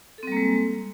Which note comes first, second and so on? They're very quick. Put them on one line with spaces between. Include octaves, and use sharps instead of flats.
A4 C4 G3 A#3 G#3